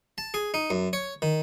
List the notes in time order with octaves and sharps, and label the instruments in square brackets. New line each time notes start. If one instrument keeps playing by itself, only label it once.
[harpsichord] A5
G#4
D#4
F#2
C#5
D#3